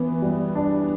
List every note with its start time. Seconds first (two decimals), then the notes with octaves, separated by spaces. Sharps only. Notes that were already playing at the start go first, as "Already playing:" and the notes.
Already playing: E3 B3
0.22 G3
0.55 D4